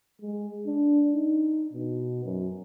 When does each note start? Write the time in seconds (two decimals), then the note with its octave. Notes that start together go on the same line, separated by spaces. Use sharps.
0.22 G#3
0.67 D4
1.14 D#4
1.73 B2
2.25 F#2